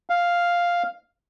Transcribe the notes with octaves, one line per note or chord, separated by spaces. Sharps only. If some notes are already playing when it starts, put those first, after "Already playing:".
F5